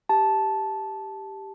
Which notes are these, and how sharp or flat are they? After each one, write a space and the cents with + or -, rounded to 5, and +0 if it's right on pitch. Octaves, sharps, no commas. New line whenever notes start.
G4 +0 A5 -10